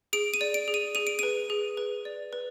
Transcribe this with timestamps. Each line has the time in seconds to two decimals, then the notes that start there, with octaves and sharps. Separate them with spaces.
0.13 G#4 D7
0.34 D#7
0.41 D5
0.54 D7
0.68 G#4
0.74 D#7
0.95 G#4 D#7
1.07 D7
1.19 B4 D#7
1.50 G#4
1.77 B4
2.05 D5
2.33 B4